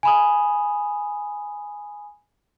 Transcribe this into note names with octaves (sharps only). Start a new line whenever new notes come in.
G#5 B5 D#6